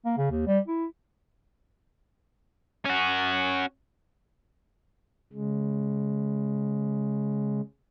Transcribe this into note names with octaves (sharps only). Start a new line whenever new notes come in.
A#3
C#3
D#2
G3
E4
C#4 F#4
C#3 G#3